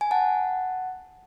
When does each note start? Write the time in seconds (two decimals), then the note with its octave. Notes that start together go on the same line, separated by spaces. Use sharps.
0.01 G#5
0.11 F#5 A5